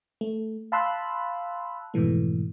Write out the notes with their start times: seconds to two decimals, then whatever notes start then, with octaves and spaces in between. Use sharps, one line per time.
0.21 A3
0.72 F5 A5 B5 C6 E6 F#6
1.94 F2 G#2 B2 E3 A3